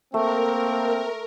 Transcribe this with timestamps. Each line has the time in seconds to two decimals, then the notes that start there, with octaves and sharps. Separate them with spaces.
0.14 A3 A#3 C4 A#4